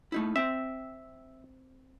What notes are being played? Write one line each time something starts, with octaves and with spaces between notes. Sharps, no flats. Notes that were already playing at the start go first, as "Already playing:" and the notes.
A3 D#4 E4
C4 E5 G5